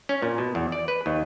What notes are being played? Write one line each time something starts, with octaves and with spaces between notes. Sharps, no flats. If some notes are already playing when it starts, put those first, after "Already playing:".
C#4
A#2
B2
E2
D5
B4
D#2